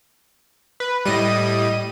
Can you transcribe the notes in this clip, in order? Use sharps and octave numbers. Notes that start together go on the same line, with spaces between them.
B4
A2 G3 D#5 D#7